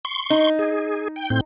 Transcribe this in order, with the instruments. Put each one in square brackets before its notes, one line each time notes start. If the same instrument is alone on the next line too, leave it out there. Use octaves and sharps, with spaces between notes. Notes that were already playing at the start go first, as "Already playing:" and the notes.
[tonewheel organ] C6 C#6
[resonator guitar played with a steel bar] D#4
[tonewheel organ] G#4
G5
A2 C4 G6